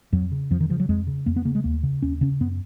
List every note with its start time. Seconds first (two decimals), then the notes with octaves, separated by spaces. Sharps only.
0.13 F2 F#3
0.32 C#3
0.51 F2 F3
0.60 D#3
0.70 C#3 F3
0.80 F#3
0.89 F2 G#3
1.07 C#3
1.26 F2 A#3
1.36 B3
1.45 C#3 A#3
1.55 G#3
1.64 D#2 A#3
1.83 C#3
2.02 D#2 C#4
2.21 C#3 C#4
2.40 F#2 B3